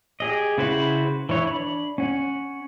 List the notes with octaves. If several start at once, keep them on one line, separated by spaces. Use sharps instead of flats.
G4 G#4 D#5
C#3 E4 F#4 B4 C5
E3 E4 C#5
D4 B5
C#4 F#5